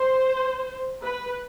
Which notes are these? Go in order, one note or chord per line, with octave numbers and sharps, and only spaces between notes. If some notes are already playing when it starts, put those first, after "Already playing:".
Already playing: C5
B4